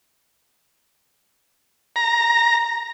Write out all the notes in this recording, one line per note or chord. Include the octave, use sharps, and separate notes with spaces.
A#5